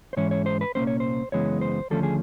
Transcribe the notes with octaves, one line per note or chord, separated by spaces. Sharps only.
C5
G#2 E3 G#3 C#4 C#5
C#5
C5
B4
C2 A#2 G3 A#3 C#4 C5
C#5
C5
F#2 C#3 E3 G#3 B3 C#5
C5
D#2 D3 F3 A3 C#4 A4
G#4